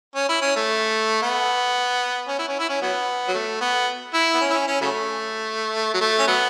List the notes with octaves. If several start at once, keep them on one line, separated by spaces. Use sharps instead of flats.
C#4
E4
C#4
A3
B3
C#4
E4
C#4
E4
C#4
F#3 B3
F#3
A3
B3
E4
B3
C#4
E4
C#4
C#4
C#3 F#3 A3
F#3
A3
C#4
F#3 B3